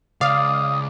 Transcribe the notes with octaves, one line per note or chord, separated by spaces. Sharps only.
C#2 D5 F5 D#6